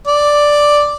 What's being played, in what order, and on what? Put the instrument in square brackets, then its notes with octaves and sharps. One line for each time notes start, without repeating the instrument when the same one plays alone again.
[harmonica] D5